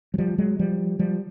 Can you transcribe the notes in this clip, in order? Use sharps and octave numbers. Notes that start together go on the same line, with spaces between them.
F#3
F3 G3
F#3 G#3
F3 G3
F3 G3